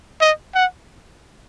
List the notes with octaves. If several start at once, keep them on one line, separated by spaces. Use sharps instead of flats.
D#5
F#5